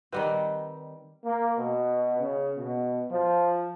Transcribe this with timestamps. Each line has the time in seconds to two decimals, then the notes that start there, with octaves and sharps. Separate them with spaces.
0.12 D#3 G3 C4 B4 D#5 F#5
1.25 A#3
1.58 B2
2.19 C#3
2.56 B2
3.11 F3